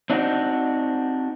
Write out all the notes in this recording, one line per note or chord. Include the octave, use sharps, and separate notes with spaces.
C4 D4 D#4 F#4